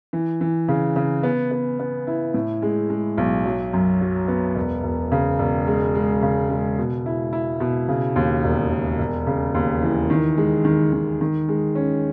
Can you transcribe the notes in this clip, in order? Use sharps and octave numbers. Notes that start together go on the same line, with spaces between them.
E3
E3
C#3
C#3
B3
B3
B3
E4
A2
G#3
G#3
B1
F#3
F#2
F#3
B3
E1
E1
C#3
E1
G#3
G#3
C#3
G#3
B2
E4
E4
B2
C#3
D#2
E1
E1
E1
C#3
D#2
E3
D#3
G#3
D#3
D#3
D#3
G#3
C#4